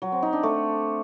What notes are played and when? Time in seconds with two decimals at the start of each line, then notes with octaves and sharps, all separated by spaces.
0.02 F#3
0.12 C4
0.22 D#4
0.33 D4
0.43 A3